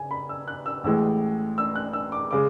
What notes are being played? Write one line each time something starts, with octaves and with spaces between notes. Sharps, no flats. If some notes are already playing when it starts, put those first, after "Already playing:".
Already playing: C#3 G#5
B5
E6
F#6
E6
A1 A2 E3 G#3 E6
E6
F#6
E6
D6
C#3 G#3 D6